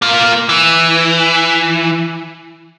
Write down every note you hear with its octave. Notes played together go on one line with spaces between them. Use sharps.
A#3 F4
E3